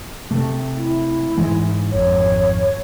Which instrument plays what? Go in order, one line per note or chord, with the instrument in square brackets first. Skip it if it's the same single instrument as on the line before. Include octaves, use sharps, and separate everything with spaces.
[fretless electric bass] C3 A3
[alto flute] E4
[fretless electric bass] G#2 E3 G#3
[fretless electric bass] G#1 F2 [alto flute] C#5